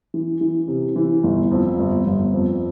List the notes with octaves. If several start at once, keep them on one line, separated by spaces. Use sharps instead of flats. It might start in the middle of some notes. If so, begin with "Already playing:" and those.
E3
E3
C3
E3
G1
F2
G1
G1
F2